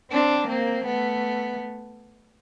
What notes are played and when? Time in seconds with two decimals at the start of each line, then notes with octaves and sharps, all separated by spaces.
0.11 C4 D4
0.49 A#3 C4
0.86 A3 B3